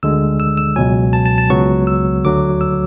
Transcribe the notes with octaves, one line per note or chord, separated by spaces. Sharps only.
D2 D3 G#3 E6
E6
E6
C#2 B2 F#3 G#5
A5
A5
A5
C#2 C#3 F#3 B3 C#6
E6
D2 D3 F#3 A3 D6
E6